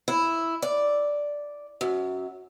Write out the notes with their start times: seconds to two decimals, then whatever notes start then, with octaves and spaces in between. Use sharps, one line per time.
0.08 E4
0.62 D5
1.81 F#2